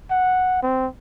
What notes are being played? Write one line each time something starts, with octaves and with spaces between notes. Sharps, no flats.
F#5
C4